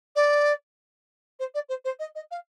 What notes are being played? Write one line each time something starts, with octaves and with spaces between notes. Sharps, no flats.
D5
C5
D5
C5
C5
D#5
D#5
F5